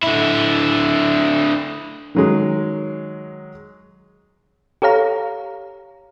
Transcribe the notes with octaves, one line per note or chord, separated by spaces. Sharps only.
D3 E4
D#3 F#3 G#3
G4 A4 C#5 F5 A#5